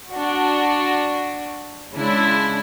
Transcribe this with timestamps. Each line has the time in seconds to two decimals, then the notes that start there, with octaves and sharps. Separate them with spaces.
0.11 D4 F#4
1.93 C#3 G#3 D4 E4